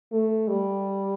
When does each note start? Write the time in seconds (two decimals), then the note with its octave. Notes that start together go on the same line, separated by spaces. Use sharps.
0.12 A3
0.48 G3